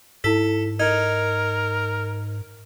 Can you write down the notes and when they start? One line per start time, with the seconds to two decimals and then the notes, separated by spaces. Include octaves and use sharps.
0.24 G#2 E4 A4 B6
0.80 D#4 A#4 G#6